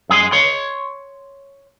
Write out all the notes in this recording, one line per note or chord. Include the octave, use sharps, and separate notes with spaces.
F#2 G#4 B5 C6
C#5 C6